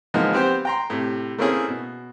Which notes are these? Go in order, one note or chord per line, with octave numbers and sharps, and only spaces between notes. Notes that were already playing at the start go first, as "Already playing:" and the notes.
E3 F3 G#3 A#3 B3 D#4
B3 C4 G4 C5
G5 A#5 C6
A2 C3
A3 A#3 C4 C#4 E4 G#4
B2